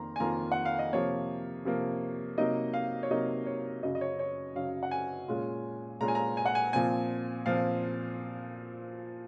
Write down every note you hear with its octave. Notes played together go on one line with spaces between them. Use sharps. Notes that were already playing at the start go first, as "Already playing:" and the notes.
Already playing: F2 D#3 A#3 A#5 C6
G#5
F2 D#3 A#3 F4 A#5
F#5
F5
D#5
C3 F3 A#3 C#5
C3 F3 A#3
C3 F#3 A#3 D#4 D#5
F5
C#5
C3 F#3 A#3 D#4 D#5
C#5
F#2 C#3 F#3 D#5
D#5
C#5
C#5
F#2 C#3 F#3 F5
F#5
G#5
A#2 G#3 C#4 F4
A#2 G#3 C#4 F4 A#5
G#5
A#5
G#5
F#5
G#5
A#2 F3 C4 G#5
A#2 F3 C4 F5